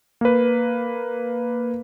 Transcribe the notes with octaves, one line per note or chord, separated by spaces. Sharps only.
A#3 B4